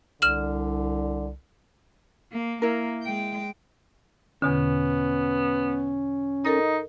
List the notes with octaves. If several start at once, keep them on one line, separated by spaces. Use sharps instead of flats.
C2 D3 F6 E7 F#7
A#3
A#3 E4 A#4
G#3 G5
E2 B2 D3 B3 C#4
D#4 A4 A#4 D#5